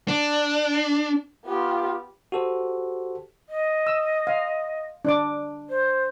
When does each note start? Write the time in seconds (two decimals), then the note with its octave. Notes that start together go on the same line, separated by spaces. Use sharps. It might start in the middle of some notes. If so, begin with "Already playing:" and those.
0.08 D4
1.46 B3 F4 G4
2.32 F#4 G4 A4 C5
3.49 D#5
3.87 E6
4.27 F5
5.05 D4 D5 D6
5.69 C5